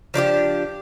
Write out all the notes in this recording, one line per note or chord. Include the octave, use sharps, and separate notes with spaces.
F3 D4 F4 G4